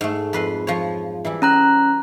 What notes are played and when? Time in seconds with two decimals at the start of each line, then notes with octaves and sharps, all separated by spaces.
0.01 G#2 A3
0.33 F2 B4 C6
0.67 F3 C#5
1.25 E3 G3 E4
1.42 C#4 A#5 F#6